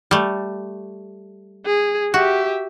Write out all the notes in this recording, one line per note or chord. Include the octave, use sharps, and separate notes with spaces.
G3 A3
G#4
F#4 G4 E5